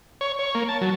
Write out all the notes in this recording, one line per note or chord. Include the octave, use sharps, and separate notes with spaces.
C#5
C#5
A#3
A5
F#3